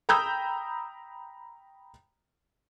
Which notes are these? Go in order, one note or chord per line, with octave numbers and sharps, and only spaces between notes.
G5 A#5 B5 D#6 E6 G6